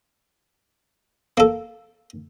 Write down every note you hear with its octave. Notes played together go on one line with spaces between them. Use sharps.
A#3 A4